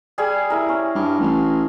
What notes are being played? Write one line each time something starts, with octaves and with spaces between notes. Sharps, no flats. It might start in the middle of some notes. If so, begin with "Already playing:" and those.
G3 G#4 G#5
E4 A#4
C#4
G2
A1